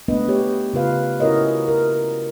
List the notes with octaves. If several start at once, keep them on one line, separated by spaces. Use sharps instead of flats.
A3 B3 C#4 D4 B4 D#5
B3 G4 C#5
C#3 F4 B4 F5
C#4 E4 F#4 A#4 C#5 D#5
A#4